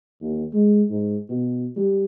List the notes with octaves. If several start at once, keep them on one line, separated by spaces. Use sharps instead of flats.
D#2
G#3
G#2
B2
G3